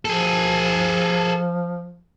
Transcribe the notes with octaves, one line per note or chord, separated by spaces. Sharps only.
F3 G#4 A4